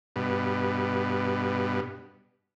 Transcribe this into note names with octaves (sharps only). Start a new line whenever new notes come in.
G2 B2